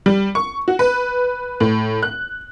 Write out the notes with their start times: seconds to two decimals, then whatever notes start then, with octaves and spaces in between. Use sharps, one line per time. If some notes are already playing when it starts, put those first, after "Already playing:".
0.06 G3
0.35 C#6
0.68 F#4
0.79 B4
1.60 A2
2.03 F#6